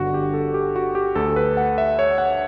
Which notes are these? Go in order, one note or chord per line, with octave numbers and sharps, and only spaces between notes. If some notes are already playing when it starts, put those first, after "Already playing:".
Already playing: G1 G2 D3 F#4
G4
A4
G4
F#4
G4
D2 D3 A4
B4
F#5
E5
C#5
F#5